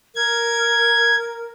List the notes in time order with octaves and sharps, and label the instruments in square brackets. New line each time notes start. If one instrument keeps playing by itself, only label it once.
[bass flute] A#4 [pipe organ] G#6